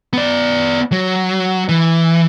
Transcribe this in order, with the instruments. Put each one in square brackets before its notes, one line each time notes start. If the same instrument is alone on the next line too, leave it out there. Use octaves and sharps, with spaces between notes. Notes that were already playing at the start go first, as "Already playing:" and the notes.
[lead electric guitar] B3 D5
F#3
E3